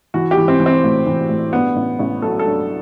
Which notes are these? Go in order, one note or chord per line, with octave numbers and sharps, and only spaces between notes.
E3 F#4
G4
E3
C4
E3
C4
A2
E3
A2
G2 B3
A1
A1
F#3 A4
A4
G2